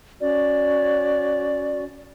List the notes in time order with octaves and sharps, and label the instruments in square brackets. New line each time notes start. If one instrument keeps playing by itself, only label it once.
[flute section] C#4 F#4 D5